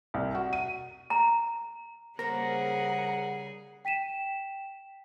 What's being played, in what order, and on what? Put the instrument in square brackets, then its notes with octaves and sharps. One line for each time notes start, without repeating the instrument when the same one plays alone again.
[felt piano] C2
F#4
D#7
[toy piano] A#5
[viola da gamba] C#3 G3 G#4 [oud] A#3 C5 [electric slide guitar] A#4 [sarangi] F#5
[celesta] G5 B6 D#7 E7